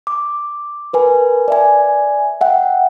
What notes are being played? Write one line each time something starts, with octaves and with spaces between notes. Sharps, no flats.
D6
A#4 B4 G#5
D5 E5 G#5
E5 F#5 G5